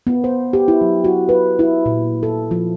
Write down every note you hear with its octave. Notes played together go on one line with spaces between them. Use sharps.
B3
C5
G4
E4
F#3
F#4
B4
E4
A#2
A4
F3